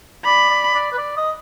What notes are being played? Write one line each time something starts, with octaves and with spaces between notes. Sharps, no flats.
D5 B5
D5
D5
B4
D5
D#5